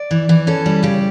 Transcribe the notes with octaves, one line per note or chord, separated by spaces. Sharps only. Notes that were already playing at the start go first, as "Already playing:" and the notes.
Already playing: D5
E3
E3
C#4 A4
G3
C#3 G4